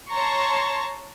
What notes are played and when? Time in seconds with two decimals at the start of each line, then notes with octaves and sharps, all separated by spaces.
0.12 C#5 A5 A#5 C6 C#6